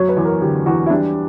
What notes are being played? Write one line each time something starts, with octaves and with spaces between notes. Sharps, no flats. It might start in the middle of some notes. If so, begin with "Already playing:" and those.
Already playing: F#2 F#3 C#5
B4
E2
A#4
D3 G4
E2 F#4
E4
G3 D4